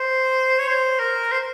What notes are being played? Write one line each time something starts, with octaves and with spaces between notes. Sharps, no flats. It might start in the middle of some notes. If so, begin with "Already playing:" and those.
Already playing: C5
C#5
C5
A#4
C5